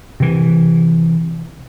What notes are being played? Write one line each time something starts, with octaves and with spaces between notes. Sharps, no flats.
C3 E3